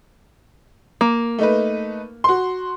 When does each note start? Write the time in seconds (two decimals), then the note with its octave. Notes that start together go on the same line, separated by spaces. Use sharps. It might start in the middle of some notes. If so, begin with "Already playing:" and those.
1.01 A#3
1.39 A3 D#4 B4
2.24 F#4 C6